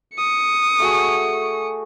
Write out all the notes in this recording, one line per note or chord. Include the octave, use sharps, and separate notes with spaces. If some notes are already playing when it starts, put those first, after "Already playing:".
D#6 C#7
A3 F#4 G#4